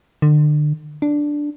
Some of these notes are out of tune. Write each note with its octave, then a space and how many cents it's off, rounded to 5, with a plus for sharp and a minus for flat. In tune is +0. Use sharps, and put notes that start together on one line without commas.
D3 +35
D4 +0